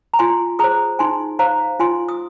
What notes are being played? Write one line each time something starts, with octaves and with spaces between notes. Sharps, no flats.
A#5
F4 G#5 C6
G#4 C5 A#5 D#6
D#4 G#5 C6
C5 F5 A#5
F4 G#5 C6
D#6